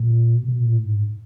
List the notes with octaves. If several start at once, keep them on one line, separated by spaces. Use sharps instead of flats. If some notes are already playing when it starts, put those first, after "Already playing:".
Already playing: A#2
B2
B2
A#2
A2
G#2